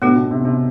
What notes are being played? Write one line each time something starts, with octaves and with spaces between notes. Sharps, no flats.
A2 B3 D4 F#4 B4
B2
C3
C3